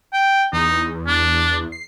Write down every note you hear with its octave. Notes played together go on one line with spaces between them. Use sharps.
G5
E2 D#4
D4
C7